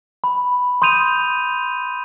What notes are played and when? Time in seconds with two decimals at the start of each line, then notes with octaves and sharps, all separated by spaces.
0.24 B5
0.82 C6 D#6 G6 D#7 F7